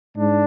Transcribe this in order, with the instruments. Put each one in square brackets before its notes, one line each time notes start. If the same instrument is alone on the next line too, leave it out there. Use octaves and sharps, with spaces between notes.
[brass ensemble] G#2 D4